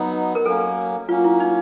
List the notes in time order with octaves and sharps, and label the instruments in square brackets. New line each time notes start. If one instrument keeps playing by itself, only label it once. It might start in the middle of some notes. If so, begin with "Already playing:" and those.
Already playing: [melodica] F#3 B3 D#4
[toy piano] A#4
[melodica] F#3 A#3 C#4 [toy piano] A4
[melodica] F#3 A#3 C#4 [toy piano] F4
[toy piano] E4
D#4